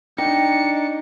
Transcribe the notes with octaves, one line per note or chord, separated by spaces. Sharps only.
D4 D#4 G5 C#7